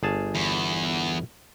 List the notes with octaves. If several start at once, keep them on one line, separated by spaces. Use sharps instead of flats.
G1 G#4 A5
E2